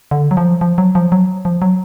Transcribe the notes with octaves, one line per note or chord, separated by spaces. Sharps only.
D3
F#3
F3
F3
F#3
F3
F#3
F3
F#3